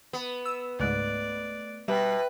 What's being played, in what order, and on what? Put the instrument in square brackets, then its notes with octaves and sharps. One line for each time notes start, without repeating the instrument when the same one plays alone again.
[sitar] B3
[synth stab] E6
[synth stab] C#2 G#2 [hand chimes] A3 F#6 [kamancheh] D5
[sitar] B2 [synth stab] G3 [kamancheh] B4 [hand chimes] E5 G5